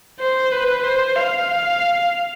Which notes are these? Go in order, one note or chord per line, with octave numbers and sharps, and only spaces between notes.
C5
B4
C5
F5